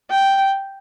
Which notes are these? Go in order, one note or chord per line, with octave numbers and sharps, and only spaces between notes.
G5